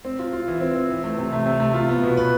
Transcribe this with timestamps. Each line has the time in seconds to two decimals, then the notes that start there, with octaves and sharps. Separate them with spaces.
0.05 C4
0.19 F4
0.33 F4
0.48 E3
0.61 C4
0.75 C4
0.90 E3
1.04 A3
1.18 C3
1.33 A3
1.46 C3
1.60 A3
1.74 F4
1.89 B3
2.03 B2
2.17 B4